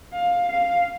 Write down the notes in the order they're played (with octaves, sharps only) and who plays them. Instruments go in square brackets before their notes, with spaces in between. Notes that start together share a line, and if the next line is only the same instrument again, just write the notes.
[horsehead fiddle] F5
F5